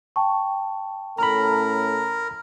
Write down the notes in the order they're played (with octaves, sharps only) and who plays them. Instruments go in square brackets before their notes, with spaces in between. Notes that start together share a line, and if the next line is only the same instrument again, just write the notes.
[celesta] G5 A5 C#6
[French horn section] A2 C#4 A4 [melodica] A#4 [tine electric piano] A#5 B5